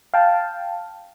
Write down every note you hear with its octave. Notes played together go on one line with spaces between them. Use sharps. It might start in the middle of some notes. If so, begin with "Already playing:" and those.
F5 G5 A5